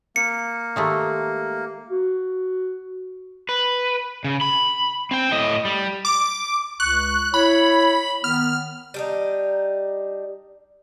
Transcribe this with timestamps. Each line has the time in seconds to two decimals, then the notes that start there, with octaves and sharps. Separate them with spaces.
0.16 A#3 C#7
0.76 D#3 G#3 A3 G4 A4 E5
1.90 F#4
3.49 B4
4.24 C#3
4.41 B5
5.11 C4 G5
5.31 A2 D#5
5.65 G3
6.05 D6
6.80 C#2 C#6 F#6
7.34 E4 C#5 B5
8.24 D#3 B3 F6
8.94 G3 D4 D#4